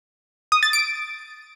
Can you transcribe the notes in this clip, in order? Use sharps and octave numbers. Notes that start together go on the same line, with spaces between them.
D#6
A6
D7